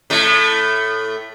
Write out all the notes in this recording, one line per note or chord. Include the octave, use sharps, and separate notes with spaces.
A2 A3